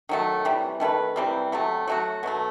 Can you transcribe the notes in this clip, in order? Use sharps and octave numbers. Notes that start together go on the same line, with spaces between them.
D#3 F#3 A3
C3 E3 G3
D#3 A3 E4 B4
C3 E3 G3 C4
C3 F#3 A3
F#3 A3 C4 F#4
B2 F#3 A3